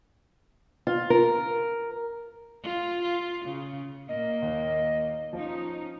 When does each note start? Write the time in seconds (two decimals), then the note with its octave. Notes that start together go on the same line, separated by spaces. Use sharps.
0.87 F4
1.10 A#4
2.63 F4
3.03 F4
3.46 C#3
4.09 A#2 A#3 D#5
4.42 D#2
5.33 F3 C#4 D#4 F4